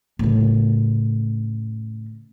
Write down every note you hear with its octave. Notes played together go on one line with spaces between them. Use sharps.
A2 C#3